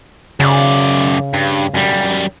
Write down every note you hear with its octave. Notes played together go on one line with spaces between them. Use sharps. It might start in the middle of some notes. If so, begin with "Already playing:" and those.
F#2 C#3 D5
G2
F#2 G3